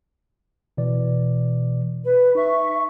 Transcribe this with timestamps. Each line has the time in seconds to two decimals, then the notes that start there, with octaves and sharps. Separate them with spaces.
0.77 B2 E3 D5
2.04 B4
2.35 D#4 E5 C#6